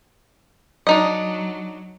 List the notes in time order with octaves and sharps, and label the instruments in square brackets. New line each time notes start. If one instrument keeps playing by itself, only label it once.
[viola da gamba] F#3 [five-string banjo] D4 D#4 D#5